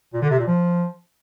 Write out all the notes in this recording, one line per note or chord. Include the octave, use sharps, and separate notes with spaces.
A#2
D3
C3
A#2
F3